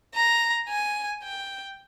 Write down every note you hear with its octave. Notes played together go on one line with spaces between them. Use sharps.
A#5
G#5
G5